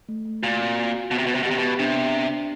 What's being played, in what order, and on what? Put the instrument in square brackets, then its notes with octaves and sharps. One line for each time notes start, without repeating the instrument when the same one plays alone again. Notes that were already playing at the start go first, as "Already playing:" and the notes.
[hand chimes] A3
A3
[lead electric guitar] A#2 [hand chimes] F#4
[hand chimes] C4
F#4
F#4
[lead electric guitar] B2 [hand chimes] B3
[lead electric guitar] C3
[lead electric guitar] B2 [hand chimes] B3
[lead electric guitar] C3
B2
[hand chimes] G4
[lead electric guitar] C3
[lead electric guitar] B2 [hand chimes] B3
[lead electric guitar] C3 [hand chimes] D4
[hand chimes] B3
D4
D4